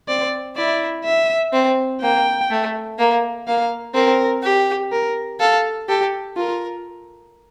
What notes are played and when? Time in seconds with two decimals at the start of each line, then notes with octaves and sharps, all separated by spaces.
0.08 C4 D5
0.56 E4 D5
1.04 E5
1.53 C4
2.01 A#3 G5
2.50 A3
2.99 A#3
3.47 A#3 F5
3.94 C4 A#4
4.43 G4
4.92 A#4
5.40 A4 F5
5.88 G4 A4
6.37 F4 A#4